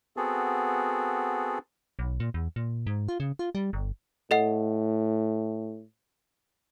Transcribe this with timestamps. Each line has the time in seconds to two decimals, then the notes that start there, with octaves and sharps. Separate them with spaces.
0.17 B3 C4 F#4 G#4 A4
1.99 B1
2.20 A#2
2.34 E2
2.56 A#2
2.87 G#2
3.08 F4
3.20 C#3
3.39 F4
3.55 G3
3.73 G1
4.31 A2 A4 D#5 F#5